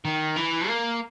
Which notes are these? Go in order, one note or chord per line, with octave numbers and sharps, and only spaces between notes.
D#3
E3
A#3